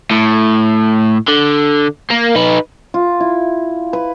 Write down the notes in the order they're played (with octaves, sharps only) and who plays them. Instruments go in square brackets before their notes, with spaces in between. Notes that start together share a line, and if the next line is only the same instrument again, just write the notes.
[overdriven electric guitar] A2
D3
A#3
D#4 B4
[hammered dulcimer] F4
E4
B4